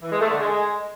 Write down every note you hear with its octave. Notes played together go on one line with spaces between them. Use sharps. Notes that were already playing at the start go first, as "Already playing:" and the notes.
E3
G#3
A3
D3
G#3